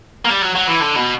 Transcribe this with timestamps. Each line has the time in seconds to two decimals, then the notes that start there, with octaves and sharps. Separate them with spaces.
0.25 A#3
0.30 G3
0.42 F#3
0.55 F#3
0.67 E3
0.80 D3
0.96 B2